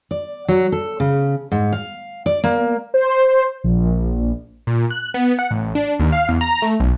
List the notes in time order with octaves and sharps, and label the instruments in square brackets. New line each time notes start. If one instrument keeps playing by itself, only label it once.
[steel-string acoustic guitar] D5
F#3
A4
C#3
G#2
F5
D5
A#3
[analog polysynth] C5
A#1
A#2
F#6
B3
F#5
A1
D4
D#2
F5
E2
A#5
A3
B1